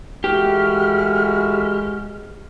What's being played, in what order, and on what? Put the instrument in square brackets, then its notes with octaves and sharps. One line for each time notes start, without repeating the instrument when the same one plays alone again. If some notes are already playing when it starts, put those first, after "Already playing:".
[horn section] E3 A3 F#4 [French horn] G#3 [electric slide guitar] G4 [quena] F6